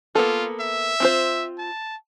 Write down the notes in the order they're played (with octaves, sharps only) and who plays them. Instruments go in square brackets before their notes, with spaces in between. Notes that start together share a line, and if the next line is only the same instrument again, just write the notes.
[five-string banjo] A#3 B3 A4 [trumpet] F4
[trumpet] E5
[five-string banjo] C4 F4 C5
[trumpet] A5